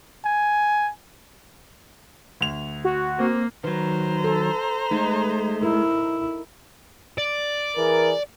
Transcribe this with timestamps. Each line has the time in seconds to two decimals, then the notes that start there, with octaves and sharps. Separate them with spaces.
0.25 G#5
2.41 D2 F7
2.85 F#4
3.19 A#3 C4
3.64 D#3 F#3 B4 C5 A#5
4.24 A4
4.91 G#3 A3 D#4
5.63 E4 A#4
7.18 D5
7.76 E3 G#4 A#4